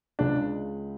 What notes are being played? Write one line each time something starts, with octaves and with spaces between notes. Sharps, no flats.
C#2 C#3 G#3 D4